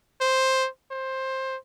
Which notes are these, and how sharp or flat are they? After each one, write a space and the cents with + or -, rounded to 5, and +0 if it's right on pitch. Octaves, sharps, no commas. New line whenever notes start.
C5 +5
C5 +15